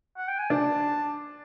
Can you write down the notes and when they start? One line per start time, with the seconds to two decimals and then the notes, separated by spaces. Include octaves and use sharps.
0.17 F#5
0.28 G5
0.39 G#5
0.50 D4 A5